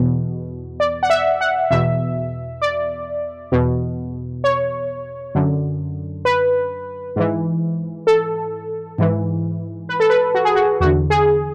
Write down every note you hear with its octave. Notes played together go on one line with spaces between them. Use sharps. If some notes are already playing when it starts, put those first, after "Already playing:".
Already playing: E2 B2
D5
F#5
E5
F#5
E2 B2 E5
D5
E2 B2
C#5
F#2 D3
B4
G#2 E3
A4
G#2 E3
B4
A4
B4
F#4
G#4
F#4
E2 D3 F#4
G#4